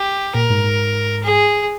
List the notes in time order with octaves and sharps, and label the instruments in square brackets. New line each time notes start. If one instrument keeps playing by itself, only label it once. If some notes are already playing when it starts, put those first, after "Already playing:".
Already playing: [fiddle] G4
[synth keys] A#2 [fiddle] A#4
[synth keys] G#2
G#2
[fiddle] G#4